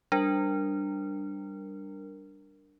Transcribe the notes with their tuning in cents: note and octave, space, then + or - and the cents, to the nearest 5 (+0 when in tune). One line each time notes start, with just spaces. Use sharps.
G3 +0 D4 +5 A#4 +0